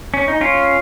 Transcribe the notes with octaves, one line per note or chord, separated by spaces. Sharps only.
C#4
D#4
C#4 F4